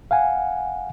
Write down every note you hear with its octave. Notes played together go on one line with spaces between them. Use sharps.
F5 F#5 G#5